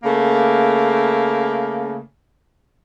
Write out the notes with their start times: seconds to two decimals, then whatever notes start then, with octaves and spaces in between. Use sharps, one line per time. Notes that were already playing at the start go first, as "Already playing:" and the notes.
0.04 C#3 A3 A#3